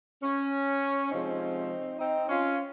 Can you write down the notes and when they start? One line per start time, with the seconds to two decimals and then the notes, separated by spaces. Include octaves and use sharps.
0.23 C#4
1.11 C3 F3 G#3 C4 D#4
1.99 C4 D#4
2.29 C#4 F4